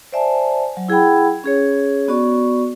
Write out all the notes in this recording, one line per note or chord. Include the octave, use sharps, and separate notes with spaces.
C5 D5 E5 G#5 A5
F#3
E4 G#4 F#5 G5 B5
C#4 G#4 C#5
B3 F#4 D5 C#6